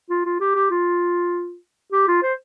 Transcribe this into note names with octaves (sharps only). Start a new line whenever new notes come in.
F4
F4
G4
G4
F4
G4
F4
C5